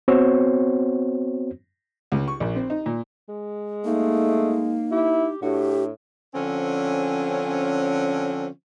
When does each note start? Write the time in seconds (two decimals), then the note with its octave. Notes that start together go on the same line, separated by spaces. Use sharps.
0.08 B3 C4 F#4 C5 C#5
2.12 C#2
2.28 C#6
2.40 A#1
2.56 C4
2.70 D#4
2.86 A#2
3.29 G#3
3.85 A3 A#3 D#4
4.92 E4 G4
5.42 A2 D4 F#4 G4
6.34 D3 F3 C4 C#4